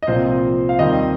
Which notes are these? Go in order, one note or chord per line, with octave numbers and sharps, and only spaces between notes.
D#5
C2 A#2 F3 C4 F4 C5
F5
D#2 D#3 G3 C4 D#5